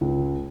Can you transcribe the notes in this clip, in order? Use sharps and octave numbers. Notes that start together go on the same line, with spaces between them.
C#2